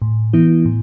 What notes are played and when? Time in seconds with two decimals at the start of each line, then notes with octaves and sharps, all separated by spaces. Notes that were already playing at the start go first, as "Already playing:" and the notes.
0.02 A2
0.33 E3 B3 E4
0.65 A2